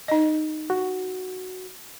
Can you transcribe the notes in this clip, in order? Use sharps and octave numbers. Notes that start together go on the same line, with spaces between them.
D#4 D#5
F#4